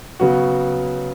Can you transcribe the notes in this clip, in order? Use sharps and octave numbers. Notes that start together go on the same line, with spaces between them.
C#3 F#3 B3 F#4